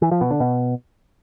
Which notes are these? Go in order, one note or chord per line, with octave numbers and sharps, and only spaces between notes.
E3
F3
B2
D3
B2